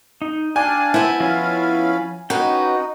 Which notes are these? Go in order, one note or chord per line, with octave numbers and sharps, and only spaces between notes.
D#4
D4 D5 F5 G5 G#5
B3 E4 C5 E5 A5
F3 C#4 F4 F5 B5
C#4 D#4 F#4 B4 G5